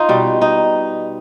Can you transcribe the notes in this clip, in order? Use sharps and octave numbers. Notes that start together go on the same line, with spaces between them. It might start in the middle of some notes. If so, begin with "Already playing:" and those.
Already playing: D#4 F4
B2 G3
D#4